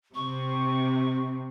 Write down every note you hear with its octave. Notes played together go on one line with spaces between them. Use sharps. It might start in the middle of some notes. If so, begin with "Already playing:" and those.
C3 C#6